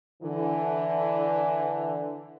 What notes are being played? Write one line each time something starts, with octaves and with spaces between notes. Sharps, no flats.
D3 E3